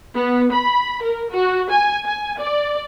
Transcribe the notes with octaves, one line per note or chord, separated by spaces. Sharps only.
B3
B5
A#4
F#4
G#5
G#5
D5